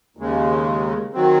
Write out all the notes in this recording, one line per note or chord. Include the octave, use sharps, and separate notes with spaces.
D#2 C#3 G#3
D#3 F#3 C4